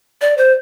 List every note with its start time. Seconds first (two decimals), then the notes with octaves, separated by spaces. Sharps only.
0.21 D5
0.37 C5